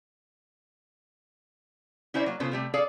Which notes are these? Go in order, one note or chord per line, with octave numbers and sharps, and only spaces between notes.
C#4 E4 C5 D5 E5
F#3 A#3
C#3 B3 F4 A4 C5
C3 G3 A3
G#4 A4 D5 F5